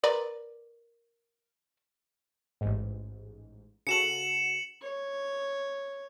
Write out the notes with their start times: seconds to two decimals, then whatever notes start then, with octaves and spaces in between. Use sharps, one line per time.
0.04 A#4 B4 D5
2.61 A1 G#2
3.87 C#3 F#4 A4 C#7 E7 F#7
4.82 C#5